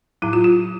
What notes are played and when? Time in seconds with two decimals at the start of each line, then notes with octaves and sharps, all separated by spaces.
0.22 A2 F#3 E4
0.33 F4
0.44 F4